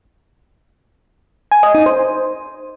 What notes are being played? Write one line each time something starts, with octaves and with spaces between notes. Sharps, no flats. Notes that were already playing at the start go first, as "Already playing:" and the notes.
G#5
D#5
D#4
C5